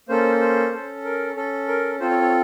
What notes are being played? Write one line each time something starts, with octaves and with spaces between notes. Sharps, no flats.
A#3 C#4 A4 C5
C5
C#4 A4
A#4
C#4 A4
A#4
C4 F4 A4 C5
C#5
C#5